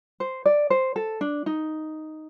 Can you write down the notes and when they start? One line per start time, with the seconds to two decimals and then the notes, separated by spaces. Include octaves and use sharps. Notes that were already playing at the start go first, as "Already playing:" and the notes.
0.20 C5
0.46 D5
0.70 C5
0.96 A4
1.21 D4
1.46 D#4